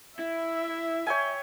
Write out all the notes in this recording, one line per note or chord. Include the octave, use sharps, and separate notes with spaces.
E4 E5
C#5 G5 G#5